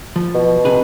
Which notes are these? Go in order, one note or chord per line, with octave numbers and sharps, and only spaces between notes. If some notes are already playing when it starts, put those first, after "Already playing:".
F3
B2
C3 G#4 B4